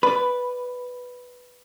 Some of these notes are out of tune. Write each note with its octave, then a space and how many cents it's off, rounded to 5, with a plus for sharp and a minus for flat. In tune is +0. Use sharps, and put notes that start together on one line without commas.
B4 +0 D5 +0 B5 +10